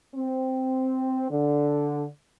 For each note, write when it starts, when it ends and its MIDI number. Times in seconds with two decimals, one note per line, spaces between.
0.15 1.27 60
1.30 2.07 50